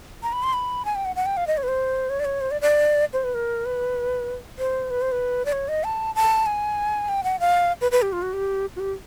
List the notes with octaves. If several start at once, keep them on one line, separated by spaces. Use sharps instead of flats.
A#5
B5
C6
B5
G#5
G5
F#5
F#5
G5
F5
D#5
C#5
B4
C5
C#5
D5
C#5
C5
D5
D5
C5
B4
A#4
B4
C5
B4
C5
B4
D5
C#5
D#5
A5
A5
G#5
G5
F#5
F5
B4
B4
G4
F4
F#4
G4
F#4
G4